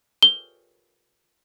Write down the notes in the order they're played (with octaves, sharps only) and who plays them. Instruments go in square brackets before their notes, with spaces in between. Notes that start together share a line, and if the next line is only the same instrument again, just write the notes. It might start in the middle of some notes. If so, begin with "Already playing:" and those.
[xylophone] G7